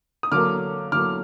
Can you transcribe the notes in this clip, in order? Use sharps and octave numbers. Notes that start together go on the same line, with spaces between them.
D#6
D3 F#3 A#3 D6 F6
D3 F#3 A#3 D6 F6